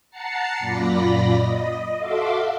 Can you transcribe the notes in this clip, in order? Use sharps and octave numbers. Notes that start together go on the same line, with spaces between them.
F#5 A5 A#5 A6 C7 C#7
F#2 A#2 F4 D5 B5 A#6
D#5
F#4 A4 E5 F5 C6 D6